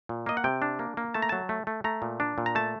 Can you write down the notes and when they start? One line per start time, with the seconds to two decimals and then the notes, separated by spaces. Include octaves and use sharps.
0.09 A#2
0.26 A#3 D#5
0.37 F#5
0.44 C3 G5
0.62 D4
0.79 A#3
0.97 A#3
1.14 A3 A5
1.22 A#5
1.29 F#3 A5
1.49 A3
1.67 A3
1.84 A3 A#5
2.02 A#2
2.20 D4
2.38 A#2
2.46 A#5
2.55 A3 A5